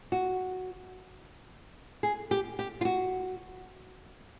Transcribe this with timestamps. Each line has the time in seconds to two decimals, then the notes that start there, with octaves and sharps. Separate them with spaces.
0.12 F#4
2.03 G#4
2.31 G4
2.59 G4
2.81 F4
2.85 F#4